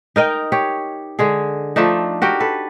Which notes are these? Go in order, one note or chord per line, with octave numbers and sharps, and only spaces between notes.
D#4 A#4 D#5 G5
G4 C#5
D3 G#3 G#4
F3 A3 D4 D#4
F#4 G4 A#4 G5
A4 B4